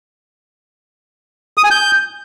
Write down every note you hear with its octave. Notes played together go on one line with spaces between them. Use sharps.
D#6
G#5
G6